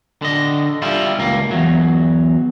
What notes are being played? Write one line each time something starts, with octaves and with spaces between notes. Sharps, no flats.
D3 D#5
G3 E4 F4
C#2 A#3
E2 G2 F#3